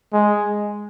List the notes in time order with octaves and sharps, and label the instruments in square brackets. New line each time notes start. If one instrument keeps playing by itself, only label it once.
[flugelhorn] G#3